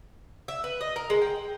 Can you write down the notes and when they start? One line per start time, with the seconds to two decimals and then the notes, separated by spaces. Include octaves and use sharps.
0.48 E5
0.64 B4
0.81 D#5
0.96 A#4
1.10 G#3
1.22 G5